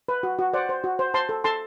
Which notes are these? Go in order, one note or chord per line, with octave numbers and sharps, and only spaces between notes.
B4
F#4
F#4
C5 D5 F#5
C5
F#4
C5
C5 A5 C6
A4
A4 A5 C6